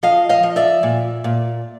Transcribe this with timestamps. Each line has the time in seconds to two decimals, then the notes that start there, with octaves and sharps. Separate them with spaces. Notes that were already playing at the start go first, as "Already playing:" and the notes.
0.03 F3 D#5 F5
0.29 D#5 F5
0.43 F3
0.56 D5 E5
0.83 A#2
1.24 A#2